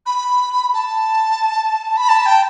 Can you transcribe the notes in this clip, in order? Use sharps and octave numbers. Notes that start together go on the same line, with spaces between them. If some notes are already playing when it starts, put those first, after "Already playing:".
B5
A5
B5
A5
G5